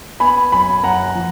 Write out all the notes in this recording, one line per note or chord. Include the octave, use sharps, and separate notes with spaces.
B3 G#5 B5
F#2 G#5 B5
F#2 F#5 A#5
F3